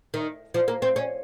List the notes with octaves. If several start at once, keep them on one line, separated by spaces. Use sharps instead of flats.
D#3
F3
A#3
C4
C#4